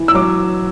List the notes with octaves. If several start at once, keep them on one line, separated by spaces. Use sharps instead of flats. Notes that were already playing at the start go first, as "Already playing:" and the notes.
Already playing: E3
E6
F#3 D6